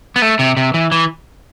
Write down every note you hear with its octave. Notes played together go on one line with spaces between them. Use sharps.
B3
A3
C3
C3
E3
E3